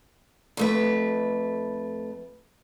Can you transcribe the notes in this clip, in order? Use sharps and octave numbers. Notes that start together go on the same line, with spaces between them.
F2 A3 B4